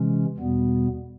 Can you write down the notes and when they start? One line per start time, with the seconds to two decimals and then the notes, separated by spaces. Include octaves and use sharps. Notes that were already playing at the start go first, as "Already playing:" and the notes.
Already playing: C3 E3 G#3 C#4
0.38 E2 B2 G3 B3